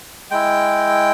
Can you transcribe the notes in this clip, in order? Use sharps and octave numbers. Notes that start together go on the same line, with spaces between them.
G#3 E4 G5